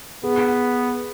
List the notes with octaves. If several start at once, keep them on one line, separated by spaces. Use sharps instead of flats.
B3 G#4